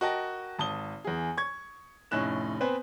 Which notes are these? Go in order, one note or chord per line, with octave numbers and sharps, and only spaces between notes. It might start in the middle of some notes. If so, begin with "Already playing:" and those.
F#4 A#4 D#5 G5 A5
G#1 A5 D#6 G7
E2 G#4
C#6 G#6
F1 A2 C#4 D#4 F#6 E7
B3 C4 B4 C5 G#5